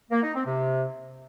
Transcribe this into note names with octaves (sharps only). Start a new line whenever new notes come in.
A#3
D#4
C4
C3